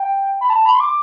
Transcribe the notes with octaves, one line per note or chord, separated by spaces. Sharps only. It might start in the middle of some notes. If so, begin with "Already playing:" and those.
Already playing: G5
B5
A5
B5
C6
D6